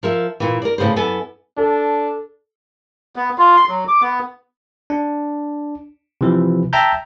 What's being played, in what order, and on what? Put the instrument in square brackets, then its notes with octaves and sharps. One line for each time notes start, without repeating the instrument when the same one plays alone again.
[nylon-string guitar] F3 A#4 E5
A#2 E3
A#4 D5
A2 C#3 B4 C5
F#2 B3 E4 A4 G#5
[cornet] D4 [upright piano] A4
[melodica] B3
F4
C6
F#3
D6
B3
[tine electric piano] D4
C3 E3 F3
E5 G5 A5 A#5 G6